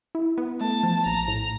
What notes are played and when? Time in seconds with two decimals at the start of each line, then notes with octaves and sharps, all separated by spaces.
0.15 E4
0.38 B3
0.60 A3 A5
0.83 F3
1.06 A#1 A#5
1.28 A2